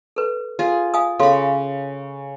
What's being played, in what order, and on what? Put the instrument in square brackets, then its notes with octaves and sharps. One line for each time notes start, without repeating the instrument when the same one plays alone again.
[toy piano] A4 B4
[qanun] F4 G#4
[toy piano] F5 G#5 D#6
[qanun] C#3 B5 [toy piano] A4 F5 C6